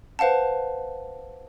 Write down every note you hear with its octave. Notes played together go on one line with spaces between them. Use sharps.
B4 C5 F5 F#5 A5